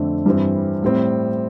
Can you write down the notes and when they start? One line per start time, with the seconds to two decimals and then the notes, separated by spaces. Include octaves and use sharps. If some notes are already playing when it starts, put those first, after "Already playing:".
Already playing: F2 D3 A3 C4
0.26 G2 E3 G3 C4
0.83 A2 G3 C4